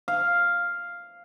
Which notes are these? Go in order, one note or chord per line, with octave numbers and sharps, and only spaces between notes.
F5